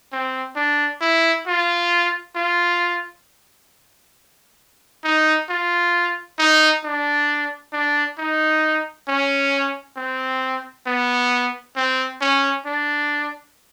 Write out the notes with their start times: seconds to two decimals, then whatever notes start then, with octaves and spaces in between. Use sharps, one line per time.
0.12 C4
0.56 D4
1.02 E4
1.47 F4
2.36 F4
5.04 D#4
5.50 F4
6.39 D#4
6.84 D4
7.73 D4
8.18 D#4
9.08 C#4
9.97 C4
10.87 B3
11.77 C4
12.21 C#4
12.66 D4